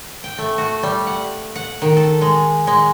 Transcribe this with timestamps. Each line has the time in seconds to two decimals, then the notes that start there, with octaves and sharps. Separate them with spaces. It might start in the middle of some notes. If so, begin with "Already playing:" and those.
0.24 G5
0.38 A3
0.58 F#4
0.83 G3
1.07 F#5
1.55 F#5
1.82 D#3
1.97 A4
2.21 G#3
2.67 G#3